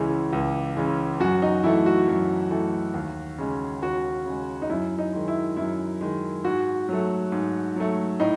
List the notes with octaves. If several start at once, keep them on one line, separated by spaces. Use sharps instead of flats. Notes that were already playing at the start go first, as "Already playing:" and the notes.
Already playing: C#2 C#3 E3 G#3 E4
C#2
C#3 E3 G#3
F#2 F#4
D#4
E3 A3 E4
F#4
F#2
E3 A3
D#2
C#3 G#3
D#2 F#4
C#3 G#3
D#4
F#2 E4
D#4
D#3 G#3
E4
F#2 E4
D#3 G#3
G#2 F#4
F#3 A3
G#2
F#3 A3
A2 D#4